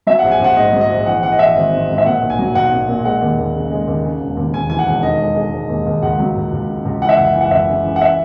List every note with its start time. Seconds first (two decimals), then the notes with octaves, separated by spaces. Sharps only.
0.07 F#3 E5
0.19 A#1 F#5
0.31 G#5
0.39 A#1 F#5
0.56 G#2 D#5
0.73 F#3
0.81 D#5
0.90 A#1
1.06 E3 F#5
1.23 E3 F#5
1.32 D#5
1.39 E3 E5
1.55 G#1
1.73 G#2
1.89 G#2
1.98 E5
2.06 A#2 F#5
2.21 B1
2.30 G#5
2.39 F#3
2.55 B1 F#5
2.72 A#2
2.88 A#2
3.04 G#3 F#5
3.21 D#2
3.37 D#2
3.55 C#3
3.71 G#3
3.87 D#2
4.04 C#3
4.20 E1
4.37 D#2
4.53 D#2 G#5
4.70 E3 G#5
4.79 F#5
4.87 E1
5.03 D#3 D#5
5.20 G#3
5.36 G#3
5.52 G#3
5.69 D#2
5.86 D#2
6.03 C#2 F#5
6.20 F#3
6.36 C#2
6.52 C#2
6.69 C#3
6.85 C#2
7.02 E3 F#5
7.09 E5
7.17 F#1 F#5
7.34 E3
7.41 F#5
7.51 F#1 E5
7.68 C#3
7.84 E3
7.96 F#5
8.01 E5